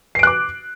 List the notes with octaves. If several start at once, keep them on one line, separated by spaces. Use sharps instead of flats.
D6 F#6 C7 D7